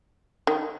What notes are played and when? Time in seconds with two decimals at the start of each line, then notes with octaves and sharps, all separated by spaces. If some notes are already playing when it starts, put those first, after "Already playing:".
0.47 D#3